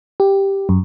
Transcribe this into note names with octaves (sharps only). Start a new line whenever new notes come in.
G4
F#2